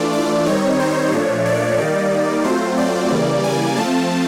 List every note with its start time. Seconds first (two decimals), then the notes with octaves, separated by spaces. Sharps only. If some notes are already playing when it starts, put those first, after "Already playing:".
Already playing: E3 A3 D4 F4 D5
0.13 D5
0.46 D#3 G3 C4 D#4 C#5
0.80 C5
1.12 A#2 F3 A3 D4 C#5
1.46 D5
1.79 D#3 G3 A#3 D#4
2.44 F#3 A3 C4 F4 C5
2.78 D5
3.11 C#3 E3 G3 A#3
3.44 G#5
3.77 F3 A3 C4 F4 A5